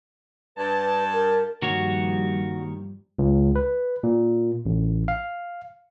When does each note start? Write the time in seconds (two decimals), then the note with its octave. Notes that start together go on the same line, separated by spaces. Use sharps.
0.57 G2 B4 A5
1.13 A#4
1.62 G2 D#3 F3 G3 A#3 F#4 C#5
3.19 C#2
3.56 B4
4.03 A#2
4.66 A1
5.08 F5